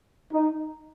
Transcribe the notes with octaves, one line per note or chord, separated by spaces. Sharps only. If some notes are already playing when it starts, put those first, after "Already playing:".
D#4